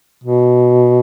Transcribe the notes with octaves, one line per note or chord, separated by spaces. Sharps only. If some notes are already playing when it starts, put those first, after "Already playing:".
B2